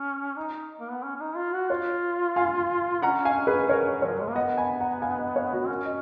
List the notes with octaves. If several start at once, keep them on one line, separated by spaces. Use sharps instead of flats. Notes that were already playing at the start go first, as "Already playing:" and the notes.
Already playing: C#4
D#4
A#3
B3
C#4
C#4
D#4
F4
F#4
F4 C#5 F5
F5 G#5
C#4 F#5 A#5
F5 G#5
G#4 B4
A#4 C#5
F3 A#4 C#5
F#3
G#3
A#3
B3 D#5 F#5
G#5 B5
F#5 A#5
F5 G#5
D#5 F#5
C#5 F5
F#4
C#4 F#4 A#4
D#5